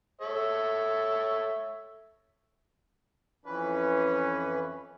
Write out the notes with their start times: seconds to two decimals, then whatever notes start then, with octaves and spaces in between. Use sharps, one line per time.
0.21 A4 C#5 E5
3.46 F2 E3 C#4 B4